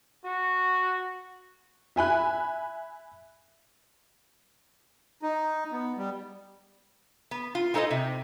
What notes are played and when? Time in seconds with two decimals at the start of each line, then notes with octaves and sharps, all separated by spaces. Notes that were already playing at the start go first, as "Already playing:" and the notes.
0.25 F#4
1.96 E5 G#5 B5 F#6
5.23 D#4
5.72 B3
5.98 G3
7.31 B3
7.55 F4
7.74 G#3 D#4 A4 C5 D#5
7.91 C3